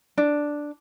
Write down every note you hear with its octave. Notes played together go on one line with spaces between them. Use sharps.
D4